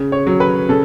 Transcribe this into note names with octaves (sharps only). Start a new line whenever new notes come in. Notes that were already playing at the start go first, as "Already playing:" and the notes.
Already playing: C#3
C#5
F#3
B4
C#3 A4